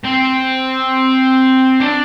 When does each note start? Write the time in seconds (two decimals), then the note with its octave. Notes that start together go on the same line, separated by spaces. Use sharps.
0.05 C4
1.80 D4